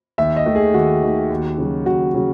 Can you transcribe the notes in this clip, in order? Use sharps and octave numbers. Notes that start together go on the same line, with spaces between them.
D#2 E5
D#5
D#3 A3
G#4
D#2 F#4
D#3 A3
D#2
C#3 F#3
D#2 F#4
C#3 F#3